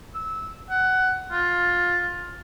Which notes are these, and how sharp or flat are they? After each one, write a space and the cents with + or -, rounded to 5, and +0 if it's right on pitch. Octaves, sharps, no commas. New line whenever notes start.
E6 -15
F#5 +15
F4 +15